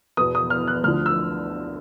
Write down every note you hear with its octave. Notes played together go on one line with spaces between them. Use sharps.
E2 B2 D#6
D#6
F6
F#6
D2 D3 F3 F6
E6